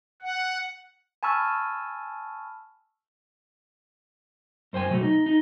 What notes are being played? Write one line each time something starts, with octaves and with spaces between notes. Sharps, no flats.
F#5
G#5 A5 B5 C#6 E6 F6
F#2 C5 G5 G#5
B2 F#3 A3
D#4
D#4